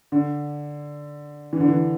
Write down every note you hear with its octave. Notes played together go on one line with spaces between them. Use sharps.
D3
E3
D3
E3